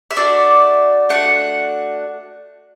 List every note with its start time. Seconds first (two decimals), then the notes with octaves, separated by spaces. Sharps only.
0.11 E5
0.16 A3 D4 F#4 D5
1.09 A3 D4 F#4 F#5